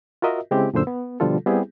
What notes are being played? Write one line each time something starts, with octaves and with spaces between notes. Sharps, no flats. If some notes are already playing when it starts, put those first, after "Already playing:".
F4 F#4 A#4 D#5 E5
C#3 G#3 C4 E4 G4
F#2 A#2 D3 C5 E6
B3
B2 D3 F3 G3 F4 A4
G3 B3 C4 E4 G4 G#4